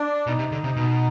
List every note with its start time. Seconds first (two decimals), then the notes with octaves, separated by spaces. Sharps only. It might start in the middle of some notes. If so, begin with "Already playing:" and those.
Already playing: D4
0.26 B2 D#4
0.39 C3
0.52 D3
0.64 C3
0.76 B2